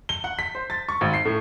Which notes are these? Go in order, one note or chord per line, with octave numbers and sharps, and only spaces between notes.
G7
F#5
B6
C5
A6
C#6
G#1
C7
A2